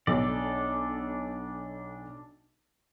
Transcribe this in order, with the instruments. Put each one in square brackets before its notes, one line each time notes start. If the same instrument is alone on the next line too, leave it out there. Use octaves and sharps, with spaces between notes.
[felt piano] B1 [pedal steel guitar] D4 A4 D5